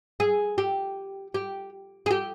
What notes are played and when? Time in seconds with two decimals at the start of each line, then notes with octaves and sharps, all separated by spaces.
0.20 G#4
0.58 G4
1.34 G4
2.06 G#4
2.11 G4